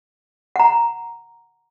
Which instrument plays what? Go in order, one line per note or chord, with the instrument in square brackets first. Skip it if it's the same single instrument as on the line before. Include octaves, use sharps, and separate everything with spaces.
[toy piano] F#5 A#5